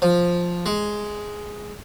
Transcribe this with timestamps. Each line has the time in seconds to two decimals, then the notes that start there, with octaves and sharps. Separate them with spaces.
0.02 F3
0.66 G#3